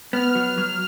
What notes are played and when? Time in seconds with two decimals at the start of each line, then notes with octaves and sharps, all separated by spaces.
0.13 B3 F6
0.35 F#3
0.58 F#3